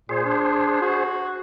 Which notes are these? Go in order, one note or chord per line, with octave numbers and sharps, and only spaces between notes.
A#2 G#4 C5
D4
F#4